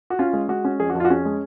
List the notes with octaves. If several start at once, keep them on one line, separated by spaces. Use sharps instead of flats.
F#4
C#4 F4
G#3
G#3 F#4
C#4
F2 G#4
F#4
F2
F4
F#4
C#4 G#4
G#3